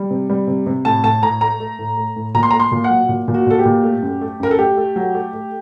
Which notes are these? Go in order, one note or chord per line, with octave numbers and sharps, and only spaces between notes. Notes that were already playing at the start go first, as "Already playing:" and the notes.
Already playing: G3
C3
G3
C3
C3
A2 A5
A2 A5
A2 A#5
A3 A#5
A3
A2
A3
A2
A#2 A#5
C6
A3 A#5
C6
A#2
F#5
F#3
A#2
A#2
F#4
A#2 A4
G4
A#2
A3
F#2
A3
F#2 A#4
A4
A3 G4
A3
F#3
A3
A3